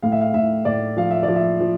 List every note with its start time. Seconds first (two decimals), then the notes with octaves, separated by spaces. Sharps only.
0.02 A2 F5
0.12 E5
0.21 F5
0.34 A2 E5
0.65 A2 D5
0.97 F3 F5
1.11 E5
1.23 D5
1.28 F3
1.35 E5
1.60 F3